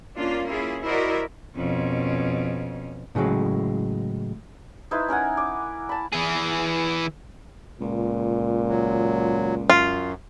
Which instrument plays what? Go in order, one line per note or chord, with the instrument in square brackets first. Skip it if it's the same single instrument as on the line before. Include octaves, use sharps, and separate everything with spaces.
[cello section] A#3 C#4 D4 F4
A#3 C#4 E4 F4 G#4
E4 F#4 A#4 C5 D5 D#5
[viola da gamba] F2 B2 C#4
[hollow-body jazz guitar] A2 C#3 E3 F#3 G#3
[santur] D#4 E4 B4 C5
C#4 A#4 F#5 G#5
D6
A5 B5
[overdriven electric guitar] E3 G#4
[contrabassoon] C#2 [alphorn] A#2
[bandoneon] F#3
[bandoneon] F#2 [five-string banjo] F4